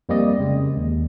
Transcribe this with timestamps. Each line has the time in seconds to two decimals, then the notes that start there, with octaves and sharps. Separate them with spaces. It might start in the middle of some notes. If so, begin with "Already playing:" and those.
0.09 F2 G3 A#3 C4 D5 D#5
0.40 C#3 G#3
0.77 D#2